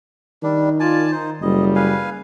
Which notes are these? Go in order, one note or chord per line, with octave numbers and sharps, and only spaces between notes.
D#3 G3 D4
F4 D5 G#5 A5
D#4 C5
F#1 G3 D#5
B4 F5 G#5